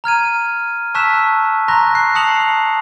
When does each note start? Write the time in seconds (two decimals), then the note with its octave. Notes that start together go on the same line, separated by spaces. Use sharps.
0.04 A#5 F6 G#6 D#7
0.95 A5 C#6 E6 F#6 B6 E7
1.68 A#5 C6 C#6 F#6 A#6
1.95 F#6 C7
2.15 A5 D#6 C7 C#7 F7 F#7